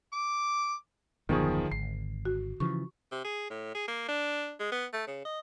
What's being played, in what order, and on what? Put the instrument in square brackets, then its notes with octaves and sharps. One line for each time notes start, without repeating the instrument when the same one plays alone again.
[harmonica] D6
[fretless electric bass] D#1 F#2 B3 [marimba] D3 C#6 [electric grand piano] D#3 F3 G#4
[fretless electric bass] G#1 [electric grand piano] C7
[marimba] F#4
[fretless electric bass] C#3 E3 F3 [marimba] C#6
[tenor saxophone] C3
G#4
A2
G#4
A#3
D4
G#3
B3
A3
C#3
D#5